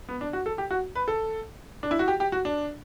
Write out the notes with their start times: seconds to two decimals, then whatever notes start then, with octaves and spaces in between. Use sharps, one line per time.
0.09 B3
0.21 D4
0.33 F#4
0.46 A4
0.58 G4
0.71 F#4
0.95 B4
1.08 A4
1.83 D4
1.91 E4
1.99 F#4
2.08 G4
2.20 G4
2.32 F#4
2.45 D4